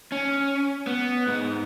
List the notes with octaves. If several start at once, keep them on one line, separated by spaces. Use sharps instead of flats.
C#4
B3
G#2